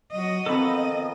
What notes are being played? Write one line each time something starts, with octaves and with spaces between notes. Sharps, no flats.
F#3 F#4 D#5
D#3 F3 B3 C4 A4 D#5 B5